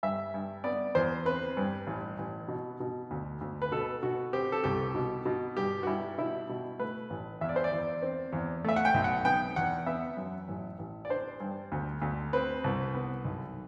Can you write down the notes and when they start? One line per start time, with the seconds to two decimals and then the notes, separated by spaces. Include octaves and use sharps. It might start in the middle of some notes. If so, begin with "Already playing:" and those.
0.03 G2 E5
0.34 G2
0.64 B3 D5
0.95 E2 C5
1.25 C4 B4
1.57 G2
1.87 A1
2.19 A1
2.48 B2
2.80 B2
3.11 D2
3.41 D2
3.62 B4
3.72 B2 A4
4.03 B2 F#4
4.33 C4 G4
4.52 A4
4.64 C2 G4
4.95 B2
5.26 B2
5.57 G2 G4
5.83 F#4
5.87 G2 E4
6.18 B2 E4
6.49 B2
6.79 A3 B4
7.10 A1
7.41 E2 E5
7.49 D5
7.56 C5
7.64 D5
7.72 E2
8.02 C4
8.33 E2
8.64 A3 E5
8.76 F#5
8.85 G5
8.94 B1
9.04 F#5
9.25 B3 G5
9.56 E2 F#5
9.86 B3 E5
10.17 F#2
10.48 A1
10.79 A1
11.05 D5
11.10 D4 C5
11.40 G2
11.72 D2
12.02 D2
12.33 C4 B4
12.64 C2
12.94 B3
13.25 B1